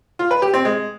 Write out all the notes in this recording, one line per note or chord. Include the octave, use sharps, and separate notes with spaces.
F4
B4
G4
C4
G#3